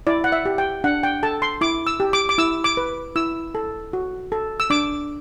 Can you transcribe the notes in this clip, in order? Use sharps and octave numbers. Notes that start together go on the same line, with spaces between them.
E4 D5
F#5
E5
G4
G5
D4 F#5
G5
A4 A5
C6
E4 D6
E6
G4
D6
D6
E4 E6
D6
B4
E4 E6
A4
F#4
A4
E6
D4 D6